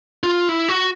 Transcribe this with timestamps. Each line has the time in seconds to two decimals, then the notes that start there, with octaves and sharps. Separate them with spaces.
0.23 F4
0.49 E4
0.69 F#4